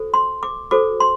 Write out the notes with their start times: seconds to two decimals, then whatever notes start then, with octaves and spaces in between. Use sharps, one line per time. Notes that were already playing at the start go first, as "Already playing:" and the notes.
Already playing: F#4 A4 C5
0.14 C6
0.43 D6
0.71 F#4 A4 C5 D6
1.00 C6